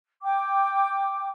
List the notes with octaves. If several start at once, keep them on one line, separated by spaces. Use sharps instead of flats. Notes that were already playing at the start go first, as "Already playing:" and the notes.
G5 D6